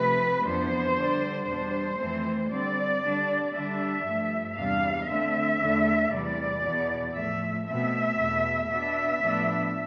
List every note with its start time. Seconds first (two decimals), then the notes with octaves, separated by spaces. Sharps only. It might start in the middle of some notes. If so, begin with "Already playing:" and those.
Already playing: C3 F3 A3 C4 B4
0.43 F2 E3 B3 D4 C5
0.95 D3 G3 D4
1.47 E2 B2 G3 D4 C5
1.98 F2 E3 A3 C4
2.49 D3 G3 C4 D5
3.01 D3 G3 D4
3.53 D3 G3 D4 E5
4.05 G2 F3 A3
4.56 E2 C3 G3 D4 F5
5.08 D3 A3 C4 E5
5.59 E2 D3 A3 D4
6.11 E2 C3 E3 G3 D5
6.63 E2 B2 B3
7.14 A2 F3 A3 E5
7.66 B2 A3 C4 E5
8.17 E2 B2 A3
8.69 B2 B3 D4 E5
9.21 A2 F3 B3 D4